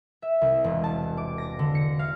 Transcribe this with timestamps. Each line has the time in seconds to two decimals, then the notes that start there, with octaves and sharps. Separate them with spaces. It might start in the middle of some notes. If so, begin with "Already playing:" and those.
0.22 E5
0.41 C2
0.64 E1
0.84 A5
1.17 D6
1.38 A#6
1.59 D3
1.75 C#7
1.99 F5